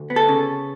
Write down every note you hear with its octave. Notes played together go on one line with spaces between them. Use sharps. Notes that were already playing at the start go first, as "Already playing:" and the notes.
Already playing: D2
B3
A4
C#3